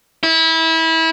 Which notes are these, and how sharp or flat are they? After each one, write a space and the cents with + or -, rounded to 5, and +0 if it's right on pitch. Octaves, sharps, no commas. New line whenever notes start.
E4 -25